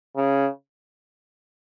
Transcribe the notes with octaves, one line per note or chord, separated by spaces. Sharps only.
C#3